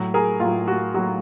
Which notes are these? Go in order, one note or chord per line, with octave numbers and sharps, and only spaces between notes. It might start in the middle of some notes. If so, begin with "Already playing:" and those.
Already playing: A2 F#3
G#4 A#4
A2 F#3 F4
F#4
A2 F#3 F#4